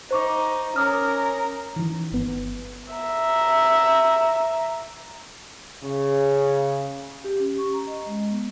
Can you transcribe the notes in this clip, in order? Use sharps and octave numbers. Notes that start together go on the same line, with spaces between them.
D#4 C5 C#6 D6
C#4 A#4 D6 D#6 F6
D#3 E3
G1 B3
E5 A#5
C#3
G4
C#4
C#6
A#5
D#5
G#3
B3